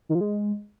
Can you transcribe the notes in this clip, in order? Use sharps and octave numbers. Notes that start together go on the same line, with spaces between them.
D#3
F3
G#3